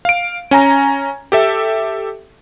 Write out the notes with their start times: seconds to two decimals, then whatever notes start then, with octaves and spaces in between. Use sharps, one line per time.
0.05 F5 D7
0.51 C#4 G#5 A#5
1.32 G4 A4 E5